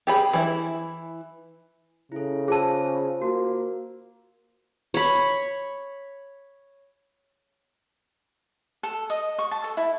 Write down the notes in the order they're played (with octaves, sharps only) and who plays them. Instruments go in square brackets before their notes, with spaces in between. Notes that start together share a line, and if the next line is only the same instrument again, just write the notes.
[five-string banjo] G4 G#4 B5
E3 E4
[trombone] C#3 [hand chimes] E4 A4
[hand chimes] F4 C5 E6 [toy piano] G#4 A5
[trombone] A#3 [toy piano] F#4
[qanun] C#5 B5
[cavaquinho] A4
D#5
C#6
A5
A4
E4